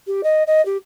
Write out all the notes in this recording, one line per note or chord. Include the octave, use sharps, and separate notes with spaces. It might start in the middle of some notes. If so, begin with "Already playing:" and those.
G4
D#5
D#5
G4